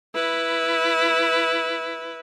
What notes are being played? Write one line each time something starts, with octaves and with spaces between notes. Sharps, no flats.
E4 B4